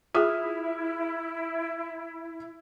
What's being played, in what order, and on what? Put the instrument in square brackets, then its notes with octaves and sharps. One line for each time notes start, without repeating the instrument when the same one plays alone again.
[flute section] E4 [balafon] F4 G#4 [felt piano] E5 D#6 F6